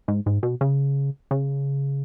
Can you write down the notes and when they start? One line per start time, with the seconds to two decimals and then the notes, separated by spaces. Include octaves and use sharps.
0.08 G#2
0.26 G#2
0.43 B2
0.61 C#3
1.31 C#3